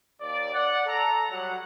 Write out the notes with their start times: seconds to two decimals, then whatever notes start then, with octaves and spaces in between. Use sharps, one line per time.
0.21 D#2 D5
0.53 D5 F#5
0.87 A4 A#5
1.31 F#3 G3 F#5